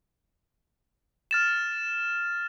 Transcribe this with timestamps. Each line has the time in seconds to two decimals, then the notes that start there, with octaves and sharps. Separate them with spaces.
1.31 F6 A6 E7